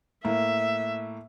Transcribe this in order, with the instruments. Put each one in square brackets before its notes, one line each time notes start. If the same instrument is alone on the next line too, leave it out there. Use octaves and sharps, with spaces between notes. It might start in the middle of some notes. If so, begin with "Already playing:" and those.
[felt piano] A2 A#3 [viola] E5